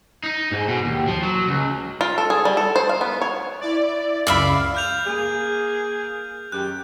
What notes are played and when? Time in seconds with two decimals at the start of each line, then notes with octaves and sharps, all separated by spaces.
0.23 D#4
0.51 G#2
0.68 B2
0.85 D#2
1.08 F3
1.23 F#3
1.48 C#2
2.01 F4
2.18 A4
2.30 G#4
2.45 G3
2.57 A4
2.76 C5
2.89 F5
3.01 B3
3.22 C#5
3.60 E4 D5
4.27 C#2 F#2 D5 E5 F5 B5
4.75 F6 G6 F7
5.06 A#3 G#4
6.52 F#2 D#3 G4 F#6